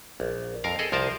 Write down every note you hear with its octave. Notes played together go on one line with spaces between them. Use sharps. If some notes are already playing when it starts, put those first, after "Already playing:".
A#1
F2 A#4 F5
G#4 A4 D#5
C2 F3 A#4 C5 A5